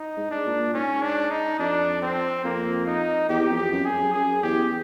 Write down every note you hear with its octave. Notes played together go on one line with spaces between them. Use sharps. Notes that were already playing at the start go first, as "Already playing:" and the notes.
Already playing: D#4
G#2
D4
A#2
G#2 C#4
D4
D#4
F2 D4
C4
F2 A#3
D#4
E2 G4
F2
G4
F#2
G#4
F#2
F#2 G#4
E2 G4